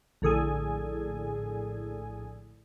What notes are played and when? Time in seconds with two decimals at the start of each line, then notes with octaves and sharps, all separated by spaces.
0.22 A#1 A2 D3 G#4 A4 G#5